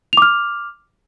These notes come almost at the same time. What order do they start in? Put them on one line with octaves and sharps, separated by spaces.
F7 D6 F6